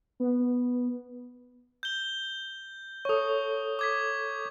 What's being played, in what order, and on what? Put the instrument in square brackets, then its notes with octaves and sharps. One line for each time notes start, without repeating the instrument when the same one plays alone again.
[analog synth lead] B3
[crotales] G6 G7
[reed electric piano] A4 C#5 [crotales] C#6 D#6
[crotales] D6 G#6 B6